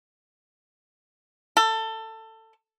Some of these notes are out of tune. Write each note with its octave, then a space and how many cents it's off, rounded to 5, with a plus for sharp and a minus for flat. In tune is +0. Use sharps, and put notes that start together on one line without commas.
A4 +20